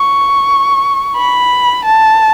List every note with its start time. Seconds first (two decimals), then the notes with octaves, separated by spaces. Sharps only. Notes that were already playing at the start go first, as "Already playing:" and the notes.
Already playing: C#6
1.17 B5
1.85 A5